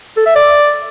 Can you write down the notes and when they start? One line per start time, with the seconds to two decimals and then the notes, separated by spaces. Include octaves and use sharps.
0.17 A4
0.26 E5
0.36 D5